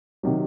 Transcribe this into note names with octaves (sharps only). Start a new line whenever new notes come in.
C3 D#3 F#3